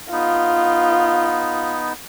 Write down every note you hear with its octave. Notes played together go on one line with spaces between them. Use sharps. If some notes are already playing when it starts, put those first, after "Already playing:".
B3 D#4 F4